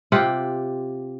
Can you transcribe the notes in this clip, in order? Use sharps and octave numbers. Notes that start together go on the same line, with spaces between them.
C3 F4 G4 F#5